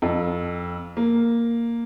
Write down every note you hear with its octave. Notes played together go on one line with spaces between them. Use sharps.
F2
A#3